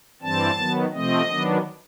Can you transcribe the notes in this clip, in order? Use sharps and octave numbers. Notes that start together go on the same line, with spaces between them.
G2 E3 G3 C4 A5
D#3 F#3 B3
C3 F3 A3 C4 D#5
D#3 F#3 B3 D4